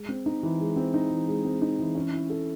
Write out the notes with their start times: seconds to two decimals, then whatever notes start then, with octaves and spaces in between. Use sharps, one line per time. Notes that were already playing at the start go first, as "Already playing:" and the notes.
Already playing: G#3
0.09 C4
0.26 D#4
0.43 E3
0.60 G#3
0.76 C4
0.94 D#4
1.11 E3
1.28 G#3
1.45 C4
1.62 D#4
1.79 E3
1.95 C#4
2.13 E4
2.30 A4